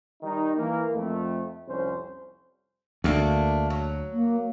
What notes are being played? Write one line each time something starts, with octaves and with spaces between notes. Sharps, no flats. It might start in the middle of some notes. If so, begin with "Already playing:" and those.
D#3 G3 D#4
E3 A#3
F2 A3
C2 F2 C#4 C5
D2 A3 A#3 D4
F#3
A#3